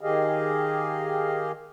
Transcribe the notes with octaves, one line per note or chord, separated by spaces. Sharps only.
D#3 G4 G#4 D#5 F5